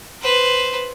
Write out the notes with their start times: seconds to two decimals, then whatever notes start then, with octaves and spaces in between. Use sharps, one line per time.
0.22 B4 C5